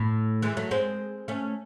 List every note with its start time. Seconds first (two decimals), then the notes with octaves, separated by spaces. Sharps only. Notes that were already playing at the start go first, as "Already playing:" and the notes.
Already playing: A2
0.42 E3 G#3
0.57 F#3 A3
0.71 G#3 C4
1.28 A3 C#4